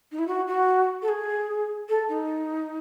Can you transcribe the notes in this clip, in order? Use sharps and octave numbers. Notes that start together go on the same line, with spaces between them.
D#4
E4
F#4
F#4
A4
G#4
A4
D#4